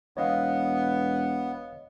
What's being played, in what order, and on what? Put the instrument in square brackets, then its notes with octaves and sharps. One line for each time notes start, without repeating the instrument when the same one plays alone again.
[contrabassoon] E1 [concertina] B3 [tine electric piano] C#5 D#5 F5